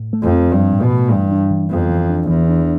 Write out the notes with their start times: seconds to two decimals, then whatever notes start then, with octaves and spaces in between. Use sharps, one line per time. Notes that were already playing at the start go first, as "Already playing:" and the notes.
Already playing: A2
0.13 A3
0.23 F2
0.32 C4
0.52 G2 F3
0.72 A2
0.82 B2
0.91 A3
1.11 G2 E3
1.31 D4
1.50 E3
1.70 F2 B3
1.90 E3
2.09 D4
2.29 E2 E3
2.48 D4